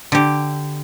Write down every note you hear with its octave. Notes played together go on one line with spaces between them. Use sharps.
D3 G4